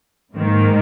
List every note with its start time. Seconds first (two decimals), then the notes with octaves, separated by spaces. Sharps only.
0.33 G#2 D#3 A#3